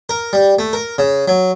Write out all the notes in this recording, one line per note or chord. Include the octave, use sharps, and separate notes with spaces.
A#4
G3
A3
A#4
C#3
F#3